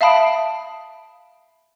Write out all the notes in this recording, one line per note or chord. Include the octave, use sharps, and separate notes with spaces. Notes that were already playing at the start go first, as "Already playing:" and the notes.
E5 F5 A5 B5 D#6 D7